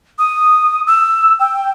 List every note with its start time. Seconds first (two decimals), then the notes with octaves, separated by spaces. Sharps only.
0.19 D#6
0.87 E6
1.40 G5